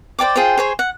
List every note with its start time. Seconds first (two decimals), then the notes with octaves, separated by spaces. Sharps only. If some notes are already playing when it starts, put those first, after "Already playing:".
0.19 C5 D5 G5 D6
0.36 F4 G#4 C5 G5
0.57 G#4 C5 C#5
0.79 F#5